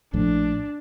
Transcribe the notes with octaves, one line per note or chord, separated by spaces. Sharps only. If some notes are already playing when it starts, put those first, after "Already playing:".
A#1 A2 F3 D4